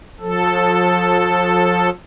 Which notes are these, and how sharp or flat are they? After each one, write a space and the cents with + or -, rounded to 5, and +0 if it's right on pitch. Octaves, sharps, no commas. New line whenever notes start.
F3 +35 A4 +0